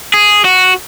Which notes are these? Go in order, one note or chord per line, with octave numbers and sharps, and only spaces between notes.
G#4
F#4